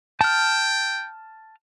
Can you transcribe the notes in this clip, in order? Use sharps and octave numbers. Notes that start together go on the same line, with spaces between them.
G5 A5 F6